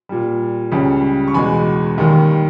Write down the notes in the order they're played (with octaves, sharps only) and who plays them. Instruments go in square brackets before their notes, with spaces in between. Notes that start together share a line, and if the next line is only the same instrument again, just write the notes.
[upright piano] A#2 G3
C#2 C#3 G3
C#6
E2 B2 G#3 G#5 B5
D#2 D#3 G3